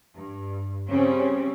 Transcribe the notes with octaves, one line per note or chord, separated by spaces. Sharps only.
G2
C#3 G3 C4 C#4